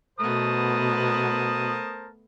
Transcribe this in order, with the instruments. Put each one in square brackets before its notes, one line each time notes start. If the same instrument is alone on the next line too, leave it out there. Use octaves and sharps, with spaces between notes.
[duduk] B2 [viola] A3 B3 [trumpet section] A#4 C5 A5 [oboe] D#6